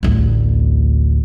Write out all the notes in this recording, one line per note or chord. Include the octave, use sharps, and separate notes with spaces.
A1 D2